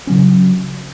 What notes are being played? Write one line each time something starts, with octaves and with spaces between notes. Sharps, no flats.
C#3 F#3 C#4